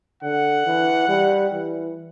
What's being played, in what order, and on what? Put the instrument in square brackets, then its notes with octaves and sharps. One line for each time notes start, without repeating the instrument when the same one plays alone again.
[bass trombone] D3 [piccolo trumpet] F#5
[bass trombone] E3
G3
E3